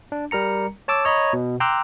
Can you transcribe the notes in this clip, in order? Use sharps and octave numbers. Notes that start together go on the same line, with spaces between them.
D4
G3 A#4 A#5 C#7
C#5 A5 D6 E6
C#5 D#5 A#5 B5
B2
G5 A#5 C6 D6 E6 F#6